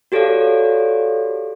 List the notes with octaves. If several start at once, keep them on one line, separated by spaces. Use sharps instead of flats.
F#4 G4 A4 C#5 D5 F5